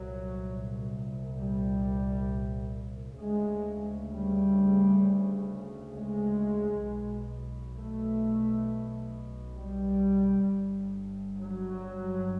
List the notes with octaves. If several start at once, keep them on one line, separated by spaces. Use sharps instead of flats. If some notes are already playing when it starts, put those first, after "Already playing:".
Already playing: C2 A#2 F#3
G3
D2 C#3 G#3
G3
G#3
B1 B2
A3
G3
G1 G2
F#3